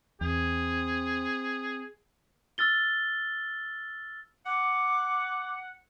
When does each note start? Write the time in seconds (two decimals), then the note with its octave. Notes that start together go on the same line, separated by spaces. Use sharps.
0.21 E2 C4 G#4
2.58 E6 F6 A6 G7
4.46 F#5 D6